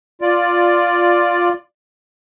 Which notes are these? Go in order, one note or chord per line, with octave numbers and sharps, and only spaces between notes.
F4 D5